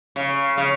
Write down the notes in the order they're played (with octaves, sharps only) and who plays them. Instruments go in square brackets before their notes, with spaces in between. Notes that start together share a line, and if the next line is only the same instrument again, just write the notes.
[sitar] C#3
C#3